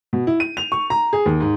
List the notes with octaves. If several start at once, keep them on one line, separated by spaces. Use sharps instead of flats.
B2
E4
D#7
F7
C#6
A#5
G#4
D#2
G#2